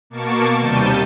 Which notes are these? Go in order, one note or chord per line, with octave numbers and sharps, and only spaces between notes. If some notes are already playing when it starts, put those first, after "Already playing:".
B2 A#3 A5 C#6 D6
D#2 C3 G3 A5 G6 D#7